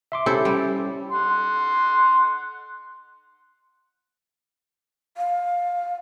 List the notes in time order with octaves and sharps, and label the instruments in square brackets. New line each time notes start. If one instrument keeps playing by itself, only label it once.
[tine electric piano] E5 C6 D6
[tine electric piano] C#4 G4 [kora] E4 A4 C5
[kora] G3
[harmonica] F#5 C6
[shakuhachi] F5